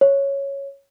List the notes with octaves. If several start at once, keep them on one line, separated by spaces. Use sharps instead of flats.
C#5